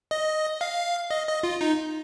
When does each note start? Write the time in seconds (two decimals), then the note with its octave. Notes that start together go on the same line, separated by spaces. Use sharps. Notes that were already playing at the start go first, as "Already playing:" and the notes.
0.11 D#5
0.61 F5
1.11 D#5
1.28 D#5
1.43 F4
1.61 D#4